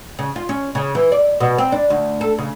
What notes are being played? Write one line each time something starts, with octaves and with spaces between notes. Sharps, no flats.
C#3
F4
C#4
C#3
E3
D5
B2
C4
D4
D2
A4
C#3